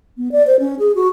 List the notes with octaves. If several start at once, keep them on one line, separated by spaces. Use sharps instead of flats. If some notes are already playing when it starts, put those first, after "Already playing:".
B3
D5
C5
C#4
G#4
F#4